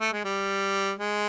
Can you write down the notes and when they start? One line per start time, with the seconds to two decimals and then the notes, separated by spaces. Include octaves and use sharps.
0.01 A3
0.13 G#3
0.25 G3
0.99 G#3